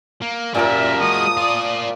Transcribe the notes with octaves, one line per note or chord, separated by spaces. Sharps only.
A#3
F#2 A#2 F3 G3 A#4 E5
G#3 F#4 D#6
F4 D5